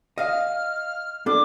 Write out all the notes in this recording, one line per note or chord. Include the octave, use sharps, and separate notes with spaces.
D#5 F5 F6
B3 D4 A4 D6